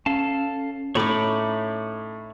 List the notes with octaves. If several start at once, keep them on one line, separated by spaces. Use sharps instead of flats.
C#4 A4 F5 A5
A2 A3 D#4 C#5 B5 D6